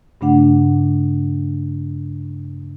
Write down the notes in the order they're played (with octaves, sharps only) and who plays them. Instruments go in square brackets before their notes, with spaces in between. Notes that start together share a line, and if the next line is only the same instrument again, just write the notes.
[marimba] G2 C#3 A3 D4 F#5